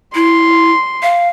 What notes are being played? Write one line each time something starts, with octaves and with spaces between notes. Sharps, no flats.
E4 C6
F5